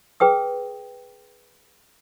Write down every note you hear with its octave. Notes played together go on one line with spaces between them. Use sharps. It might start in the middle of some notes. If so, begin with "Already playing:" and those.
G#4 B4 G5 D#6